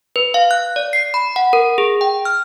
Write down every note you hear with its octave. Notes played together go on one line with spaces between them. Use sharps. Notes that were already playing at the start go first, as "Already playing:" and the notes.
B4
F5
F#6
D5
C7
B5
F#5
A#4
G#4
G5
F6